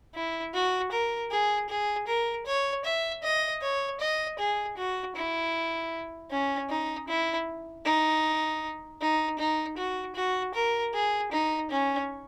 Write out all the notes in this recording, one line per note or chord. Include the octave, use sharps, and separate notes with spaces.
E4
F#4
A#4
G#4
G#4
A#4
C#5
E5
D#5
C#5
D#5
G#4
F#4
E4
C#4
D#4
E4
D#4
D#4
D#4
F#4
F#4
A#4
G#4
D#4
C#4